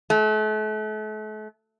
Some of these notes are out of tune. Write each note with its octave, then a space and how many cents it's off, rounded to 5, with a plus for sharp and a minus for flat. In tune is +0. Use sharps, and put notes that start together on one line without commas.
A3 -40